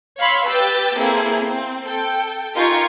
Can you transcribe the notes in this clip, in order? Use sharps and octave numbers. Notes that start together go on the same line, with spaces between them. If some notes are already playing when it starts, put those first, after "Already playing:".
C#5 F5 B5 C6 E6
G4 B4 G5 E6 A6
A#3 C4 E4 G#4 A4
C4
A4 G5
D#4 F4 G4 A#4 G#5 C#6